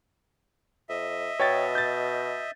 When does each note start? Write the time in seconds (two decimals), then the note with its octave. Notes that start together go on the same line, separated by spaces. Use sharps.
0.89 F2 D#5 E5
1.40 B2 C#5 G5 A6
1.75 G6 A6